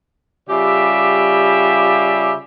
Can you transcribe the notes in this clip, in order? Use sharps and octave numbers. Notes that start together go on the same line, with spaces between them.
C#3 G3 F4 G4 D5 E5